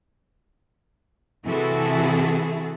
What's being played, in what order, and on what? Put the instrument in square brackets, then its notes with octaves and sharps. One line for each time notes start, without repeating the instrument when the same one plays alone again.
[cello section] C3 E3 E4 F#4 G#4 A4